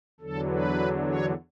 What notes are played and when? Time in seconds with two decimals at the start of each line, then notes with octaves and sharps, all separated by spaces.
0.20 E2 D3 F#3 A4
0.49 B4
1.06 C#5